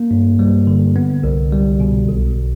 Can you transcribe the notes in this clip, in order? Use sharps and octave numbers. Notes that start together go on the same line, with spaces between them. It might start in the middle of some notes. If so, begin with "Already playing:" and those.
Already playing: A#3
G2
G3
D3
B3
C2
G3
B2
B1